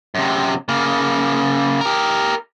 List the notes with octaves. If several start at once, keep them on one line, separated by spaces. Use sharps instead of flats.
F#2 C3
C#3 A#3
G4 A#4